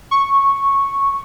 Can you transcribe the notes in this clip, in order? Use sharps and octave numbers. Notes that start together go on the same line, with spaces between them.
C#6